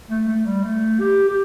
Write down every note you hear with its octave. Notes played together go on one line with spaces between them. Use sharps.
A3
A3
G3
A3
G4
G4